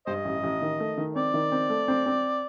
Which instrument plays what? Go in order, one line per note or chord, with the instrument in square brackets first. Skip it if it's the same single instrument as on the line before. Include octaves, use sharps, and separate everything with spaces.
[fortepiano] G2 [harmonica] C5 D#5
[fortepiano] A1
A1
D#3
A3
D#3
[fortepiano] C4 [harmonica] D5
[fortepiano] D#3
C4
A3
C4
C4